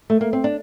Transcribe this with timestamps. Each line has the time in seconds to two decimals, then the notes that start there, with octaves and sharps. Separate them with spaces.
0.10 A3
0.21 A#3
0.33 C4
0.44 D4